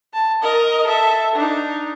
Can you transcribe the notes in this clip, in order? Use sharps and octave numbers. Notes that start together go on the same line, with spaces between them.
A5
A#4 D#5
A4 E5
D4 D#4